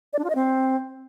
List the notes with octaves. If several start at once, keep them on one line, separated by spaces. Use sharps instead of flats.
D5
D4
F4
D#5
C4